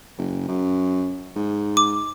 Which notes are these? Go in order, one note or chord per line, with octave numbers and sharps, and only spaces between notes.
F#1
F#2
G#2
D6